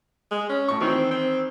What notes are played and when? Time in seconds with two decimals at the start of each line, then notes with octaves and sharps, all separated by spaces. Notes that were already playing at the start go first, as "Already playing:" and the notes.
0.31 G#3
0.49 C#4
0.68 A2 C#6
0.81 D#3 E3 C4
1.11 C4